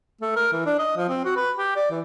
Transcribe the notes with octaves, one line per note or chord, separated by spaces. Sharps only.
A3
A#4
E3
D4
D#5
F3
C4
F#4
B4
G4
D5
E3